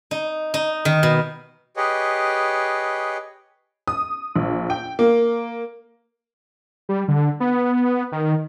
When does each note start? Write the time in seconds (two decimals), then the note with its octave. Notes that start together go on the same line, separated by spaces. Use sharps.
0.11 D#4
0.54 D#4
0.85 D#3
1.03 B2
1.77 G4 G#4 B4 C#5 D#5
3.87 D#6
4.36 A#1
4.70 G5
4.99 A#3
6.89 G3
7.08 D3
7.40 B3
8.12 D#3